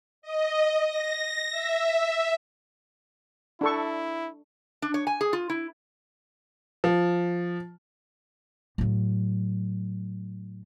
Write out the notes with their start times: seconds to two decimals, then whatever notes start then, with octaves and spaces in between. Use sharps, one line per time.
0.22 D#5
0.84 A#6
1.50 E5
3.61 D4 E4 A4 C#6
4.82 D4
4.94 C#5
5.07 G#5
5.21 G#4
5.33 F4
5.50 E4
6.84 F3
8.78 A2 F#3